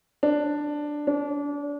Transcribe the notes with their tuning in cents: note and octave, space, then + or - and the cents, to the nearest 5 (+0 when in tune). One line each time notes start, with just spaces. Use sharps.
D4 +5
D4 -30